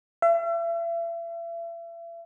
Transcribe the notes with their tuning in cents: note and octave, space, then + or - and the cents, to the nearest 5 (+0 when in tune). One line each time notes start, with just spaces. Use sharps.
E5 +40